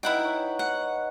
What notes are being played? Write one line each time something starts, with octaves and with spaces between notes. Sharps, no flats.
B3 D#4 E4 D#5 F#5 G5
C#5 G#5 B5
F#5